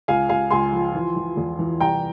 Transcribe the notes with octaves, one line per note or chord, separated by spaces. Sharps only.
C#2 F5 G#5
C#2 F5 G#5
C#2 G#5 C6
F3
E3
E3
E2
E3
C2 G5 A#5